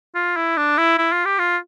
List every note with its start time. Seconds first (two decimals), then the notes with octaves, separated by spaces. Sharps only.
0.15 F4
0.36 E4
0.57 D4
0.78 E4
0.99 E4
1.13 F4
1.25 G4
1.39 F4